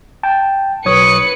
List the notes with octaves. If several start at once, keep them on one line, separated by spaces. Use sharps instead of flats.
G5 A5
B1 B4 C#5 D#6 C#7